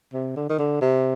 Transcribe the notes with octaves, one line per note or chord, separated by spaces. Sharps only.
C3
D3
D#3
D3
C3